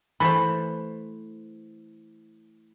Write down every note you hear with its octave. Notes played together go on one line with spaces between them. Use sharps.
E3 A3 C5 B5